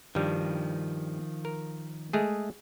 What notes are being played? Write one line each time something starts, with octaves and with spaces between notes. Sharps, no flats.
G2 D#3 F3 G3
A#4
G#3 A3 G#4